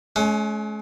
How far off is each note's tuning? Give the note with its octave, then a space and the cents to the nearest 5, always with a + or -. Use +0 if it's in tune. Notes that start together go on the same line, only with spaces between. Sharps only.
G#3 +45 C#4 +10